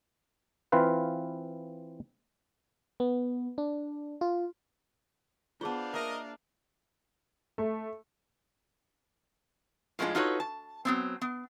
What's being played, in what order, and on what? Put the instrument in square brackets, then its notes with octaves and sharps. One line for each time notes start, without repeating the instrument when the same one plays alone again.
[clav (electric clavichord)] E3 C4 F4 B4 F5
[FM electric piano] B3
D4
F4
[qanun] B3 C5 [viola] D4 F5 [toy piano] F4 G#4 A5
[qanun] A#3 [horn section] A#4 D#5 [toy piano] E5
[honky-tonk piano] A3
[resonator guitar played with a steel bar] A2 F3 G#3 B3 D4 F4
D#4 F4 F#4 A4 B4 C#5
A5
F#3 B3 C4
B3